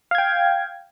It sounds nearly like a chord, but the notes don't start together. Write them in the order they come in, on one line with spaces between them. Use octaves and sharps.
F5 G#6 G5